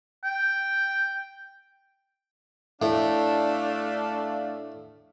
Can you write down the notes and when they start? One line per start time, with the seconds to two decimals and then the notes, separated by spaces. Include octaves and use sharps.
0.24 G5
2.82 A2 A3 D4 F5